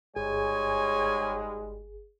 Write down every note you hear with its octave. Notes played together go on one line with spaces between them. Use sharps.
G1 G#2 G3 G#3 G#4 C#5 G#5